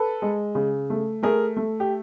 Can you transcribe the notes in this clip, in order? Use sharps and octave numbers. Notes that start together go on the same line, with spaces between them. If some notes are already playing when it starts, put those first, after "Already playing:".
Already playing: A4 B4
G#3
C#3
A3
A3 G#4 A#4
A3
G4